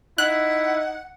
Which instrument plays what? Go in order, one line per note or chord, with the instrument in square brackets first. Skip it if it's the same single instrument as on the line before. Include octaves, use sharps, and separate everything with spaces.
[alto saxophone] D#4 [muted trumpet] E4 [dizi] F#5 [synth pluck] F#6